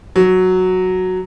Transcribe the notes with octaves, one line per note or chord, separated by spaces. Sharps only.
F#3